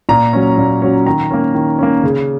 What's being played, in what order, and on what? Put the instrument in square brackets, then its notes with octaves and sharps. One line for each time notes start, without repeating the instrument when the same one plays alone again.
[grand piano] A#2 A#5
F#3 C#4
A#2
F#3 C#4
D#3 A#5
A#3 C#4
D#3
A#3 C#4
C#3